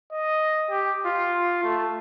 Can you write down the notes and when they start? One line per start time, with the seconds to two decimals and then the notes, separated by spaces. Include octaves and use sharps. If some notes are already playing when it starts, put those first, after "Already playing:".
0.12 D#5
0.70 G4
1.06 F4
1.64 A3